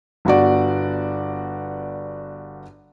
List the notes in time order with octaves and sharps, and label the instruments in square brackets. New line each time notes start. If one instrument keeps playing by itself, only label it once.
[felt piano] G1 B3 F#4 D5